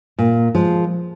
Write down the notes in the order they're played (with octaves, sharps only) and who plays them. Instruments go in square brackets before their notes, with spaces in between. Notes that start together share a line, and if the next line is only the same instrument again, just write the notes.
[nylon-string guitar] A#2
F3 G#3